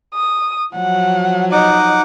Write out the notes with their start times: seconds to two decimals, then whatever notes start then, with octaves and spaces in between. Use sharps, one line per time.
0.14 D#6
0.75 F3 F#3 F#5
1.52 D#4 D#5 F#5 D6